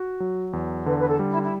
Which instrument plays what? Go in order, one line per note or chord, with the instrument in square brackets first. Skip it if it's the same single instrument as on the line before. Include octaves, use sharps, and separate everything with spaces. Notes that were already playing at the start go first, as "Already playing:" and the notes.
Already playing: [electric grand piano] F#4
F#3
E2
[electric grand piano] D3 [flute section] B4
[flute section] B4
A4
[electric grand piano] G3
[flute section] E4
E4